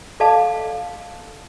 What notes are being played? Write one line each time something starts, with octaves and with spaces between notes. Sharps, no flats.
A4 D5 D#5 F5 A5 D6